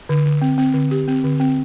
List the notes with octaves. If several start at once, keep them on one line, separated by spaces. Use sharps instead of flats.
D3
D3
C4
C4
D3
G4
C4
D3
C4